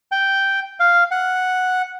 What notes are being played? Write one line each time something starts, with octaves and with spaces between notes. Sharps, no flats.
G5
F5
F#5